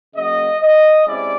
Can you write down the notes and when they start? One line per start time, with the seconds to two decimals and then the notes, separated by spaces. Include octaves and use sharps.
0.15 C#3 F#3 A#3 D#5
0.61 D#5
1.06 C3 G#3 C#4 E4 D5